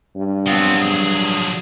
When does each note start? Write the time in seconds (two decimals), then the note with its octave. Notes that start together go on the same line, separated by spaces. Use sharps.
0.16 G2
0.46 F3 F#3 B3 C4 F5
0.80 G#4